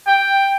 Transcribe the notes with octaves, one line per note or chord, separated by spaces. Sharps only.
G5